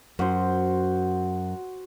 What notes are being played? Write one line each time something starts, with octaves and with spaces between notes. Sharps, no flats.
F#2 F#4 C5